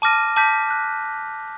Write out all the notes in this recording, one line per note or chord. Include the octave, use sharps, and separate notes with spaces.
A5 D6 F6 A#6 D#7
A5 D6 G6 B6
F#6